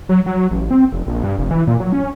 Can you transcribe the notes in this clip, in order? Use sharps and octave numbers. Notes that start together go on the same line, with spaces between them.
F#3
F#3
A1
C4
F1
A#1
G2
F1
E3
A#2
F#3
C#4